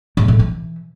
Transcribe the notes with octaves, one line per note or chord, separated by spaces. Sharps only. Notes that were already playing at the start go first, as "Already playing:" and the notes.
G#2
A2
E3